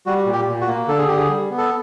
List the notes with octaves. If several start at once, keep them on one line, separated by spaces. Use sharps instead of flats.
G3 F#4
A#2
G4
A#2
F#4
A#3
D3 A4
G#4
D3 G4
G#4
G3
B3
A4